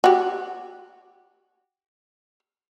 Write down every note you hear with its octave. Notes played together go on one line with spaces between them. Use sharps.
F#4 G4